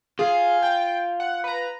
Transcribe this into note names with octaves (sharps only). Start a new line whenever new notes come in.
F4 G#4 F5
G5
F#5
B4 A#5